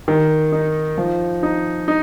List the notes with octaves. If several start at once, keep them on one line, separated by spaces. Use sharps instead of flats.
D#3
D#4
F3
D#4
D#4